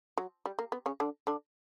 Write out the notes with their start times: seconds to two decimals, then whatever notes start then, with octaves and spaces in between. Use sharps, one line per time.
0.18 F#3
0.46 G3
0.59 A#3
0.72 B3
0.86 C#3 C#4
1.00 D3 D4
1.27 D3 D4